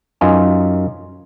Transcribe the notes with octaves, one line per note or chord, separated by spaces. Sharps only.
F#2 D#4 F4 G#5